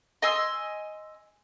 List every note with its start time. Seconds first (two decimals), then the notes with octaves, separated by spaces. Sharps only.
0.22 D#5 G#5 C6 E6